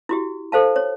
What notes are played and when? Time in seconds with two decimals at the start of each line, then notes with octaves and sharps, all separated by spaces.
0.09 E4 F#4 G4
0.52 A4 C5 F5 A5
0.76 C#5